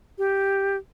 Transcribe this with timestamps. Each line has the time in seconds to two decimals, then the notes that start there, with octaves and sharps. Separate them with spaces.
0.18 G4